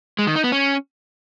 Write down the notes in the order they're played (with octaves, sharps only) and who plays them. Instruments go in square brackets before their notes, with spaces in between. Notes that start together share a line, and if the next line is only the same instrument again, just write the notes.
[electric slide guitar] G#3
D#3
D#4
B3
C#4